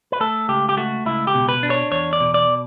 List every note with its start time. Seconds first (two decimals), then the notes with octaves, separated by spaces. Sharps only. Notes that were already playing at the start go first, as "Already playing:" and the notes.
0.12 B4
0.20 A3 A4
0.49 C#2 G4
0.69 G4
0.77 A3 F#4
1.06 C#2 E4
1.27 G4
1.34 B2
1.49 B4
1.63 D4
1.70 C#5
1.91 E2 C#5
2.13 D5
2.21 B2
2.34 D5